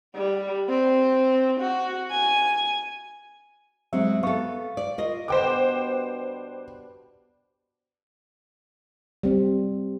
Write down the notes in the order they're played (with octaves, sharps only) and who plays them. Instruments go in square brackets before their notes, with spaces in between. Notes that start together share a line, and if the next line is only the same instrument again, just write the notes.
[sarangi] G3
C4
F#4
G#5
[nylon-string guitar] F#3 G#3 [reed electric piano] C4 E5
[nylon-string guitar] B3 A4 [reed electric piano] F5 C#6
[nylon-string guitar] D5
F4 A#4 D#5
[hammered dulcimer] B2 G3 D4 [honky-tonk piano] C5 G5 D6
[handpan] G3 C4